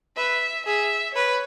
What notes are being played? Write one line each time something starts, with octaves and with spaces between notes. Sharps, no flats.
B4 E5
G#4 E5
B4 C#5